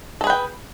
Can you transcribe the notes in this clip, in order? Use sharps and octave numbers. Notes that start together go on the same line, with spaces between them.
G#4 A4 B4 G5